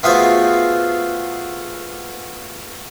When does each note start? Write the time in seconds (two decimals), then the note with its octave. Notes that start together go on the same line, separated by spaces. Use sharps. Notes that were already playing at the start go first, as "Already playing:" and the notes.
0.03 A3 B3 F4 F#4 G#4 C5